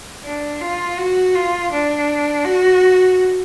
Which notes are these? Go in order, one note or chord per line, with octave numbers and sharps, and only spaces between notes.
D4
F4
F#4
F4
D4
F#4